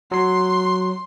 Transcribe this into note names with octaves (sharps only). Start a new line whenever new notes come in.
F#3 C6 C7